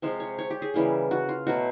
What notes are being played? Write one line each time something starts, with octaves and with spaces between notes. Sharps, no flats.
C3 F3 G#3
C#5
C#5
G4
G#4
C#3 E3 G3 A#3
F#4
F4
B2 F#3 A3 F#4